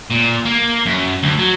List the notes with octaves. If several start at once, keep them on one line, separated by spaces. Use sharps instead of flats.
A#2
A#3
F#2
D2
F#3